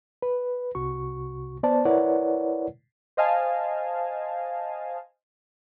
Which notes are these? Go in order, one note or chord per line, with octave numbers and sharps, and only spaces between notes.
B4
C2 C3 F#4 C#6
B3 C5 D5 A5
E4 A#4 B4 C#5 D5 F#5
C5 D#5 F5 G#5 A5